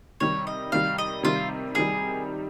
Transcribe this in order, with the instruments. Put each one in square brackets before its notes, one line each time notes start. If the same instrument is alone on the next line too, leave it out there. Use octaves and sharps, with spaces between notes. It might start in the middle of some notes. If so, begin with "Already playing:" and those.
[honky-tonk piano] C3 D#3 G3 [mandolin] C#5
[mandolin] D#5
[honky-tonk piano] C3 D#3 G3 [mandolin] F5
[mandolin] D#5
[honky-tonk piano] C3 D#3 G3 [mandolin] F4
[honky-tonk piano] C3 D#3 G3 [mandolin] G#4